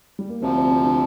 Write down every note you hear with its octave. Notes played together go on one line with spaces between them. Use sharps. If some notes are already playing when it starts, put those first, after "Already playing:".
G3
A#3
D2 C3 F3 C4
C4
C4
D4